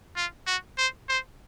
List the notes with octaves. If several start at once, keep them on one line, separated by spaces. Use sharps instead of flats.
F4
F#4
C5
C5